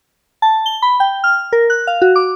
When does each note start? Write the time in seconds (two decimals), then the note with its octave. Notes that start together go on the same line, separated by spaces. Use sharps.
0.42 A5
0.66 G7
0.82 B5
1.00 G5
1.24 F6
1.53 A#4
1.70 F#6
1.87 F5
2.02 F#4
2.16 D6